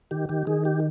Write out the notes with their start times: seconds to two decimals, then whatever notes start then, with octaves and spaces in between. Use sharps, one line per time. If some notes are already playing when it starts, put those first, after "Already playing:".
0.11 D#3 G4
0.29 D#3 G4
0.47 D#3 G#4
0.65 G4